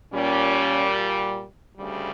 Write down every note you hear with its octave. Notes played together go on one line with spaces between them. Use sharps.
A#2 G3 C#4
D2 C#3 G3